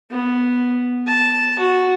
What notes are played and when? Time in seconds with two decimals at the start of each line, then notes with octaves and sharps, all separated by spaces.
0.10 B3
1.07 A5
1.59 F#4